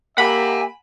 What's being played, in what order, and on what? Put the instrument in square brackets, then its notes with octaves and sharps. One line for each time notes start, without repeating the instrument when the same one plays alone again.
[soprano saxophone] A#3 [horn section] G4 E5 [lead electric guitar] F#5 G#5 [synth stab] B5